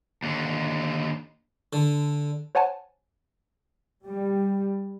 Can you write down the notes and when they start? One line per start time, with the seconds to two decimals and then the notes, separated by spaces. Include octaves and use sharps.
0.23 D#2 D3
1.73 D3
2.55 C5 C#5 F#5 G#5 A5
4.05 G3